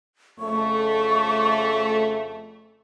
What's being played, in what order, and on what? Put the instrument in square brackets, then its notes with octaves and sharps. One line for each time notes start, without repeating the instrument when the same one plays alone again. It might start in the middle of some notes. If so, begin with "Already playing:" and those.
[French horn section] F2 C#3 A3 [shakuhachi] C#6